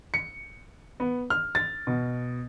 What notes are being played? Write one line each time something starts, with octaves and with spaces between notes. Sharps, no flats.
C#7
B3
F6
A6
B2